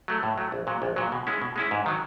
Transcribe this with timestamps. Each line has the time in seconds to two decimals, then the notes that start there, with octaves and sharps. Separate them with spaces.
0.08 F#3 A3
0.23 A2
0.38 F#3 A3
0.52 A#1
0.67 A#2 F#3
0.82 A#1
0.96 A#2 F#3
1.12 B2
1.27 G#3 C#4 E4
1.42 B2
1.56 G#3 C#4 E4
1.71 G#2
1.86 D#3 F#3